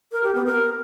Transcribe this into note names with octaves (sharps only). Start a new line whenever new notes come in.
A#4
G4
B3
A#4